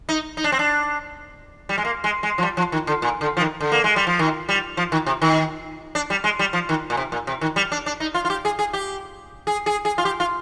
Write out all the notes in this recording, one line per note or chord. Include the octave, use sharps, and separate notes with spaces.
D#4
D#4
D4
C4
D4
G3
G#3
A#3
G#3
G#3
F3
G3
F3
D#3
D3
A#2
D3
F3
D#3
D3
A#3
G#3
G3
F3
D#3
G3
F3
D#3
C3
D#3
D4
G3
G#3
G3
F3
D#3
A#2
C3
A#2
C3
D#3
G3
D4
D4
D#4
F4
F4
G4
G#4
G#4
G4
G#4
G#4
G#4
F4
G4
F4